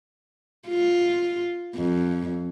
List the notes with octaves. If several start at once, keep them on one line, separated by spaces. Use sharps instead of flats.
F4
F2